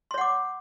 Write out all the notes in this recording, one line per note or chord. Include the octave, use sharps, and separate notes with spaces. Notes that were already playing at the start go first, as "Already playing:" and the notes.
C#5 F#5 C6 D6